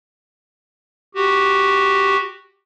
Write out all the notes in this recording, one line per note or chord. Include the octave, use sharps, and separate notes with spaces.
F#4 G4